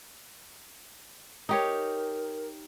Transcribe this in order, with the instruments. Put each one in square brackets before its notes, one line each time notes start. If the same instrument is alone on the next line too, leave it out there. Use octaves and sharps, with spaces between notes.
[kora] D#4 G4 C#5 [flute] A#4